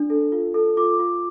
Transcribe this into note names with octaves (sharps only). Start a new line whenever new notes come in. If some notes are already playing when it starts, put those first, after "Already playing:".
Already playing: D4
A4
F4
A4
F4 D6
F4